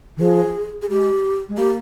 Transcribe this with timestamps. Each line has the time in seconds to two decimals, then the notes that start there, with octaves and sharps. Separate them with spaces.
0.17 D#3
0.20 F3 G#4
0.82 G#4
0.89 G#3 G4
1.48 G#3
1.57 A#3 G4